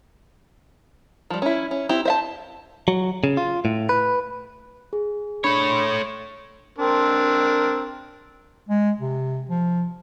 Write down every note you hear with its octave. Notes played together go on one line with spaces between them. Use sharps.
F3 G3
C#4 E4
C#4
C4 E4 G4
C5 E5 A5
F#3
C#3
F4
A2
B4
G#4
A3 D4 C#5 B5 C#7
C6
C4 D4 A#4
G#3
C3
F3